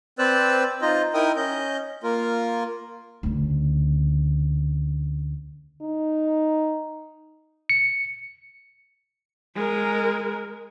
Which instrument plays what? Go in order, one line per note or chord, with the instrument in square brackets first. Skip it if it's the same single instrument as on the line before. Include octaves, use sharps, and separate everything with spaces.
[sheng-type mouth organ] C4 B4 C5 D5 E6 F#6
D#4 F4 C5 D#5
D#4 E4 A#4 G5 D#6
C#4 D#5 G6
A#3 F4 A#4
[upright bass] D2 C#3
[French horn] D#4
[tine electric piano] C#7
[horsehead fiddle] G#3 A#4